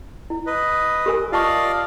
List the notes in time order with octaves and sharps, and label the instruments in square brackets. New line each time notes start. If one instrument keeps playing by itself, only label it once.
[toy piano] E4
[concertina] B4 D#5
[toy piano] G4 A#4 G#5
[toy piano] F4 A5 C#6 [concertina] D5 D#5 F5